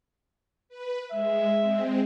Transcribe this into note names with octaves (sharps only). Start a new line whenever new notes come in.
B4
G#3 E5
G#3 C4